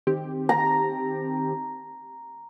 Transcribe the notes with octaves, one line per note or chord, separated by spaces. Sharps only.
D#3 C4 G4
A#5